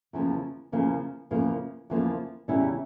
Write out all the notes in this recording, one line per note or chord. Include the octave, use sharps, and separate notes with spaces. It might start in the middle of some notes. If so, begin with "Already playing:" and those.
E2 C#3 F3 A#3
E2 C#3 F3 A#3
E2 C#3 F3 A#3
E2 C#3 F3 A#3
E2 C#3 G3 C#4 E4